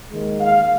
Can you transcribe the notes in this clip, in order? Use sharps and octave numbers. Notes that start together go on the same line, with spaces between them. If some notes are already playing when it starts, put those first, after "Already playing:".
D#2 D#3 G#3
F5